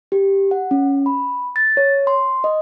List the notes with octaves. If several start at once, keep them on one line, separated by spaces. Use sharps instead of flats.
G4
F#5
C#4
B5
A6
C#5
C6
D#5